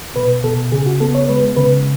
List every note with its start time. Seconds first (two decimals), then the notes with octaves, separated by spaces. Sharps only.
0.16 B2 B4
0.44 B2 A4
0.72 C#3 G#4
0.86 F#4
1.01 B3 A4
1.15 C#5
1.29 G#3 B4
1.56 C#3 B4